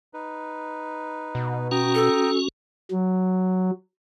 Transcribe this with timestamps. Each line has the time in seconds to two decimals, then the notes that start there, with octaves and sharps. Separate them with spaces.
0.13 D#4 B4
1.35 B2
1.71 C#4 F#4 G5 A#5 D#6
1.95 A4
2.91 F#3